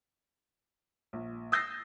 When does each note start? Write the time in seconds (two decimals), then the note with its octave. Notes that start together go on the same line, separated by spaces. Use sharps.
1.13 A#1
1.52 D#6 E6 G6 A6 A#6 C7